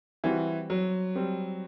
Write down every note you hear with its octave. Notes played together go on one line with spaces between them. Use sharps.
E3 G3 C4 F#4
F#3
G3 C4